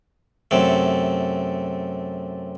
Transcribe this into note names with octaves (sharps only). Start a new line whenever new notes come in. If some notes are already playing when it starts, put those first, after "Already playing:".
F#2 C3 A3